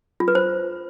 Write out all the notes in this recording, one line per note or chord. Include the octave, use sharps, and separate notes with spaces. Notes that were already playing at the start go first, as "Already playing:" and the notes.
F4
B4
C5